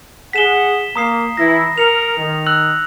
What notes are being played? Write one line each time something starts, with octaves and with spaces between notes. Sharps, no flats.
G#4 F#5 B6 E7 G7
A#3 A#5 D#6 C7
E3 E4 A#6
A#4 C#7 F7
D#3
E6 F#6 F#7